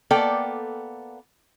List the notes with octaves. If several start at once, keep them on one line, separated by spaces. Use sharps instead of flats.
A#3 B3 A4 D5 G5